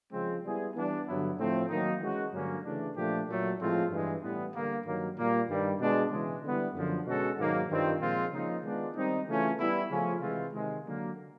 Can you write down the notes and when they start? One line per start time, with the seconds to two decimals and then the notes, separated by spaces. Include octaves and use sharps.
0.13 C#3 F3 G#3 C4
0.44 G3 B3 E4 G#4
0.75 E3 G3 B3 D4
1.07 G2 D3 F#3 B3 E4
1.39 A2 F3 A3 C4
1.70 D#3 F#3 A#3 D#4
2.01 E3 G#3 C#4 F#4
2.33 G2 D3 F#3 A#3 C#4
2.65 C#3 E3 A3 D4
2.96 A#2 F3 A3 D4 G4
3.28 A#2 F#3 A3
3.59 A2 F3 G#3 C4 F4
3.90 G2 E3 G#3
4.22 A2 E3 G3 B3
4.54 D3 G3 A#3
4.85 G2 D#3 F#3 A#3
5.17 A#2 G3 A#3
5.49 G2 D#3 G3
5.79 B2 G#3 B3 D4
6.11 C#3 E3 G#3
6.43 D3 G3 B3 E4
6.74 F#2 D3 F3
7.06 B2 G#3 C#4 F#4 A4
7.38 G#2 D#3 F#3 A#3
7.69 G2 D#3 G3 C4 F4
8.00 A#2 F3 G#3 C4 F4
8.32 C#3 F3 A#3 D#4
8.63 D#3 G#3 B3 D4 F4
8.96 D#3 G3 C4 D#4
9.27 C#3 E3 A3 C#4 F4
9.58 G3 B3 E4
9.90 C#3 F3 A3 C#4 F4
10.21 C3 E3 G#3 C4 F4
10.53 C3 D#3 G#3
10.85 D3 F#3 A#3